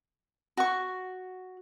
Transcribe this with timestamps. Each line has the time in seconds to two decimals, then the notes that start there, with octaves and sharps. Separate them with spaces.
0.57 F#4 C#6